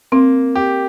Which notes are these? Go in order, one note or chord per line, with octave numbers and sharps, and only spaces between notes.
A#3 C4
G4